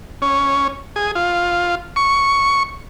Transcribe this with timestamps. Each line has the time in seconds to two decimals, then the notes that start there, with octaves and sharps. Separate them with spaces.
0.22 C#4
0.96 G#4
1.15 F4
1.96 C#6